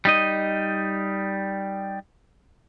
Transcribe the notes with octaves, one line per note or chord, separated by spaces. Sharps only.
G3 D#4 D#5